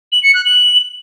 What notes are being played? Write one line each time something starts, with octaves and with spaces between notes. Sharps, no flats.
F#7
C#7
F#6
F#7